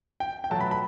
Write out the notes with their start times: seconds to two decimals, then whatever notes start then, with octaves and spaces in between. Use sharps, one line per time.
0.20 G5
0.44 G5
0.50 B2 F#3 A3 A5
0.61 B5
0.71 B5